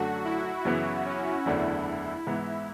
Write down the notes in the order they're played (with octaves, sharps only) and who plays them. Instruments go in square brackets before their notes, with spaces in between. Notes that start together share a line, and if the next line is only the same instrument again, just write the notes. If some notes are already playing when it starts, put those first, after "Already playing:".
Already playing: [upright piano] F#2 D3 F#3 A3 D4 [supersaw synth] F#4
[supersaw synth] E4
[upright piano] F#2 C#3 E3 B3 F#4
[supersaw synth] C#4
[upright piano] F#1 E2 D3 A3 D4 [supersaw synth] E4
[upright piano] G#2 E3 B3